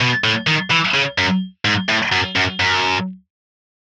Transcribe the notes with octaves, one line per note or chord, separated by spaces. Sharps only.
B2
A2
D#3
E3
C#3
F#2
G#2
A2
F#2
F#2
F#2